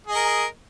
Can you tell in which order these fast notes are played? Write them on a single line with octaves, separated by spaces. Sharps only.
G#4 D#5 A#4